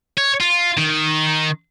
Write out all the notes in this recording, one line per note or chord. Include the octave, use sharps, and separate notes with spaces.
C#5
F4
D#3